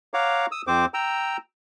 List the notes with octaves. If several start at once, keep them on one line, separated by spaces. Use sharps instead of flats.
C#5 F5 F#5 A#5 D6
D#6 E6
F2 C4 C5 D6
G5 A#5 E6